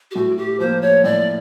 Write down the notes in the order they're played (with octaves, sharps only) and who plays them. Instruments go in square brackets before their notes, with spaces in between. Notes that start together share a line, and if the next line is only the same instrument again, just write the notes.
[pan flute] G4
[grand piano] A2 [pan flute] F#4
[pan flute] G4
[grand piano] F3 A#3 [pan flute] C5
[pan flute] C#5
[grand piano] A2 [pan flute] D5